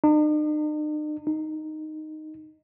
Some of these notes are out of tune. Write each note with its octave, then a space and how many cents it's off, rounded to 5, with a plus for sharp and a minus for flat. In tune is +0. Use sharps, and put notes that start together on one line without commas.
D#4 -45
D#4 -5